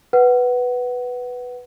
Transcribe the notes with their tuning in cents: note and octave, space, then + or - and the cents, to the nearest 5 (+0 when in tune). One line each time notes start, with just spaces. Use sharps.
B4 +0 F#5 +15